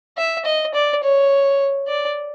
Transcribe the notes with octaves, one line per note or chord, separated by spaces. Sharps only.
E5
D#5
D5
C#5
D5